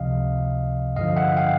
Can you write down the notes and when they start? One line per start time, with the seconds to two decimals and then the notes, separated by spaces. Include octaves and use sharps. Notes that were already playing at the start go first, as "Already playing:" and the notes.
Already playing: C#2 C3 F3 D#5 F5
0.96 G2 D3 F3 D#5 F5
1.16 E5 F#5
1.37 F5 G5